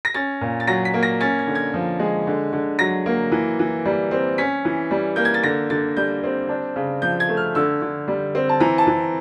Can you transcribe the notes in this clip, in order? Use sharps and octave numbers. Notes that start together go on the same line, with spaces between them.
A#6
C#4 A6
A#2
A6
F#3 A#6
B6
A#3
A#6
C#4 A6
G#6
D3
G#6
F3
G#3
D3
D3
F#3 A#6
A#3
E3
E3
G3
C4
C#4 B6
E3
G3
A#3 G6
G#6
A6
D3 A#6
D3 A6
G3 G6
C4
D4
C#3
F3 G6
G#6
A3
F6
D3 E6
D3
G3
C4
A5
E3 A#5
A5
E3